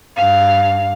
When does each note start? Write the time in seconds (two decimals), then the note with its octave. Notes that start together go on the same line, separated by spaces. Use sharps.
0.16 G2 F5